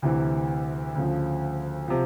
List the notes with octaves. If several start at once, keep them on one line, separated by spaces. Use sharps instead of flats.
D2 C3 E3
D2 C#3 F3
C3 F3